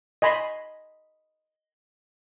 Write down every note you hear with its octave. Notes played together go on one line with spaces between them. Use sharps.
D#5 G#5 B5 C6